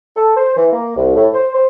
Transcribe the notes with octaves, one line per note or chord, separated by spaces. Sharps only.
A4
C5
E3
A#3
C2
A2
C5
C5